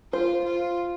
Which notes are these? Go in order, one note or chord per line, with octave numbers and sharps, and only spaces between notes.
F4 C5
F4